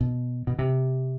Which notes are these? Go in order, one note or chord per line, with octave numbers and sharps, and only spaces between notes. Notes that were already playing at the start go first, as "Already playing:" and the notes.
B2
B2
C3